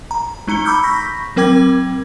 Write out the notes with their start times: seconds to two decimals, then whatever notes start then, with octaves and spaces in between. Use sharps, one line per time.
0.11 A#5
0.48 G#3 D#4 A#5 C#7 G7
0.65 A#5 B5 D6 E6 F6 G6
0.83 B5 C#6 G6 A#6 B6
1.36 F#3 C4 A#4 G5 D6 G#6